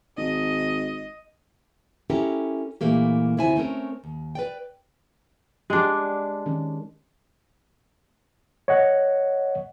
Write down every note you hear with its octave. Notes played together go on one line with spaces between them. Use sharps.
G#1 D#5
C#4 E4 G4 A4 A#4
A#2 E3 A3 A#3 G4
D2 C3 E4 C5 G#5
A3 C4 C#4 A#4
D#2
B4 D5 G5
G#3 D4 G4
D#3 C#4
C#5 D#5 F#5